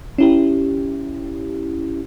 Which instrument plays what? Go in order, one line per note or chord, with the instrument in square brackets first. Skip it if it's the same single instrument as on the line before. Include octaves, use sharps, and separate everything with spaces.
[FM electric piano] C#4 E4 G4